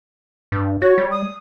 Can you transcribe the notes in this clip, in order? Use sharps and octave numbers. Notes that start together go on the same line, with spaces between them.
G2
F#4 C#5
G3
D#6